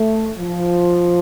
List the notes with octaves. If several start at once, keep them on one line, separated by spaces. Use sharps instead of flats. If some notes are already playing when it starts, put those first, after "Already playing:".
Already playing: A3
F3